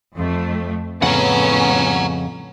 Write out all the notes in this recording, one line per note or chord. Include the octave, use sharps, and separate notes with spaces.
F2 A3
F2 A2 C#3 B3 C#4 F#5 A#5